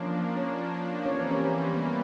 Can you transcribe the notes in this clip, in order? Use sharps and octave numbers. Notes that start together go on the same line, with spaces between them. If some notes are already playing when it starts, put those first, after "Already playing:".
Already playing: F3 A#3 C#4 D4 C#5
C#4 C#5
E3 G3 A#3 C#4 C#5
C4 C5
C#4 C#5
C4 C5
B3 B4